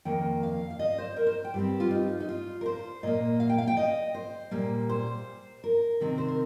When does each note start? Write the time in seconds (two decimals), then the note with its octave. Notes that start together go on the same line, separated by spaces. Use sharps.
0.05 F2 D#3 A#3 G5
0.43 F5
0.70 F5
0.79 D#5
0.98 C5
1.16 A#4
1.27 C5
1.45 G5
1.54 G2 G3 C4 G4
1.80 F4
1.91 D#4
2.20 D#4
2.29 F4
2.61 A#4
2.66 C5
3.03 A#2 A#3 D#5
3.40 F5
3.49 G5
3.58 F5
3.68 G5
3.77 D#5
4.14 C5
4.51 A#2 G3 A#3
4.89 C5
5.64 A#4
6.00 C3 D#3 C4
6.18 C5
6.28 A#4